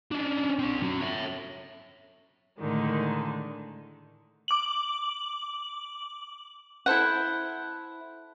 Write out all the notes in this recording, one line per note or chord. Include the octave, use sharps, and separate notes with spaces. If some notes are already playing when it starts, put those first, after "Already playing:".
C#4 D4
C4 D5
C#4 F#4
C#5 E5
A2 D3 D#3 G#3
D6 F#7
E4 A4 C5 F#5